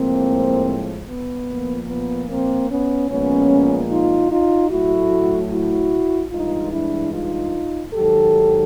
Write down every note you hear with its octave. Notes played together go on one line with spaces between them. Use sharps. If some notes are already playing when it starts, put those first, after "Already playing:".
Already playing: A2 F3 G#3 A#3 C4
B3
A#2 F3 A#3
B3
A#3 C4
B3 C#4
A#2 F3 G#3 B3 C#4
D#4 F4
D#4 F4
A2 F#3 A3 E4 F#4
E4 F#4
G2 E3 G#3 D#4 F4
D4 E4
D#4 F4
G#2 D#3 F#3 G4 A4